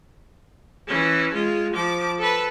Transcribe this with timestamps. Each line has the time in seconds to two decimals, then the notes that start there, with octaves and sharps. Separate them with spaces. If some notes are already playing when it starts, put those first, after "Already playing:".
0.87 E3 C#4
1.34 G#3 F4
1.74 F3 D6
2.18 A4 B4